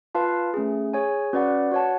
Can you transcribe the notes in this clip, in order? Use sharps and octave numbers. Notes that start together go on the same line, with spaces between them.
F4 B4 F5 A5
A3 C#4 G#4
G#4 C#5 G#5
C#4 F#4 B4 D5 F#5
F#4 C#5 F#5 A5